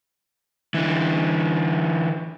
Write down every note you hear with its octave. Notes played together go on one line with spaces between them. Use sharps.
D3 E3